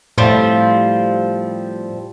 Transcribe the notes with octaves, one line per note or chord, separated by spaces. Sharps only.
A2 F3 G3 C4